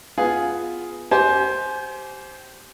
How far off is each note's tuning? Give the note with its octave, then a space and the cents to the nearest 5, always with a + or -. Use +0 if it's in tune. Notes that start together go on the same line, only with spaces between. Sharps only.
B3 +0 F4 +0 G#4 +0
G4 -25 C5 +0 G#5 +30